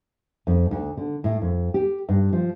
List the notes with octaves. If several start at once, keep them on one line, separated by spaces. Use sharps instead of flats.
F2
D2
D3
A2
F2
G4
G2
F3